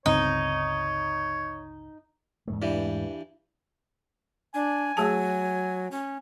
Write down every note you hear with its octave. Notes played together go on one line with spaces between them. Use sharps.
G1 C#2 C4 D#4 C#5
E2 G#2 A3
G2 E3 G3
D4 G#5
F#3 A3 G#4 A5
C#4